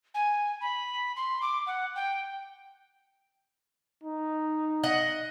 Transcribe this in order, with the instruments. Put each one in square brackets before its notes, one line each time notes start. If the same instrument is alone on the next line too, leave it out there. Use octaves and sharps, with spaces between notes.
[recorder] G#5
B5
C6
D6
F#5
G5
[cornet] D#4
[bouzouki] D#5 F#5